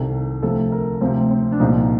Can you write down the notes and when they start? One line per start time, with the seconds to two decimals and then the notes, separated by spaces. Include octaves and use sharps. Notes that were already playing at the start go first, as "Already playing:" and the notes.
Already playing: C2 C3 D#3 A4
0.42 D2 C3 F3 A4
0.72 A#4
1.01 D2 C3 F3 C4
1.31 C4
1.52 D4
1.60 C2 A#2 F3 D#4